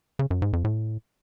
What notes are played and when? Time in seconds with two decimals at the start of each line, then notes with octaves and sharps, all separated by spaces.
0.19 C#3
0.30 F#2
0.42 G#2
0.53 F2
0.64 A2